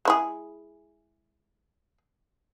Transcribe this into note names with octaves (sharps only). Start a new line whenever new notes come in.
G#3 E4 G#4